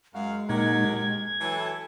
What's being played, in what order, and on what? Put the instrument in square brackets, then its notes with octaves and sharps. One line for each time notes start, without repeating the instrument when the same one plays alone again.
[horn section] F#2 F#4 F5 [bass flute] G#3
[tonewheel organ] A#2 D#4 G#6 [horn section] F#3 G4 A#4
[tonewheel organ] G#6
[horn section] E3 F#3 A4